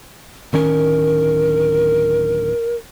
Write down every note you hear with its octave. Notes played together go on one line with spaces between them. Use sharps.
D1 D#3 C#4 A#4